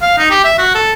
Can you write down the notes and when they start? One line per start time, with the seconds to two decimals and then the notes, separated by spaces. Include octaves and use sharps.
0.02 F5
0.18 D#4
0.30 G4
0.44 E5
0.58 F#4
0.75 A4